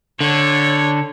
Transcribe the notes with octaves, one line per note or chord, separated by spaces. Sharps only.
D3 C#5